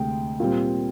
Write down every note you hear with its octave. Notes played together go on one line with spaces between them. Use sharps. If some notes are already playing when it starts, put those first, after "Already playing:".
Already playing: D2 C3 G#3 G5
A#2 G3 C4